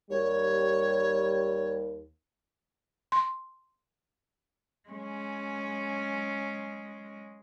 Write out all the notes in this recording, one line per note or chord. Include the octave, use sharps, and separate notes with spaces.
D#2 G3 C#5
C6
G#3 C#4